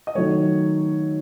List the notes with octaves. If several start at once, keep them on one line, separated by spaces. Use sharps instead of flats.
D#5
D#3 F#3 A3 C#5